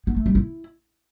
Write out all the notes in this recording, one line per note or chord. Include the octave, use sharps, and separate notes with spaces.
B3
A3
G3
E4